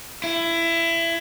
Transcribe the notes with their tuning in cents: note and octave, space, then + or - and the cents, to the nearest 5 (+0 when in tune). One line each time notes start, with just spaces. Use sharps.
E4 +20